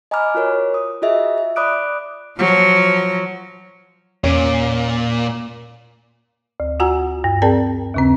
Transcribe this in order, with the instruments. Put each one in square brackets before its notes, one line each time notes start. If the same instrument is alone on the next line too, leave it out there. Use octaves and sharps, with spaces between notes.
[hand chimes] D#5 G#5 A#5 B5 D6 F6
F4 F#4 A#4 C#5
D#6
F4 F#4 G#4 D#5 E5
E5
D5 B5 D6 D#6 F#6 D7
[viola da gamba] F3 F#3
[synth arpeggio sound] E2 D7 D#7 [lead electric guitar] A#2 [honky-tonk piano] C#4
[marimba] D2
F4 F#4 F#5 G#5 A#5 E6
G2
C4 G#4 A#4 D5 G5 A5
D#2 C#3 C4